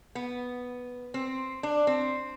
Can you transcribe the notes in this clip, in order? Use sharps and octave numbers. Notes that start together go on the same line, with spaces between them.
B3
C4
D4
C4